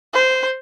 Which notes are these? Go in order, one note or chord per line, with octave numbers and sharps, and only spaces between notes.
C5